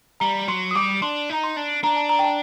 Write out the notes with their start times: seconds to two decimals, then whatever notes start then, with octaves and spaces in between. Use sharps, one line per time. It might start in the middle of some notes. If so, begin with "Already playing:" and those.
0.20 G3 A#5
0.48 F#3 C6
0.71 D#6
0.75 G3 D6
1.02 D4 C6
1.30 D#4 A#5
1.43 C6
1.56 D4
1.84 D4 A#5
1.96 A5
2.09 A#5
2.19 G5
2.24 A5